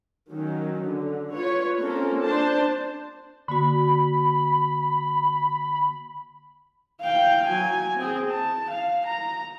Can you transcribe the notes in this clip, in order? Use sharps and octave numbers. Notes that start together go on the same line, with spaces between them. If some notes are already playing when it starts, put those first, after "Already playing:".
D#3 F#3 C#4
D3
F4 B4 C#5
A#3 C4 C#4 F4 A4 A#4
D4 C5 A5
D3 A#3 F#4 B5
F5 G5
F#3 G#5
C4 G#4
A5
F5
A#5